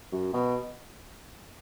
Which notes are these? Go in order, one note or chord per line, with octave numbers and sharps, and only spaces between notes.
F#2
B2